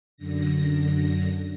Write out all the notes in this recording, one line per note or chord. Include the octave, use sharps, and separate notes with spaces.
F#2 D3 A#6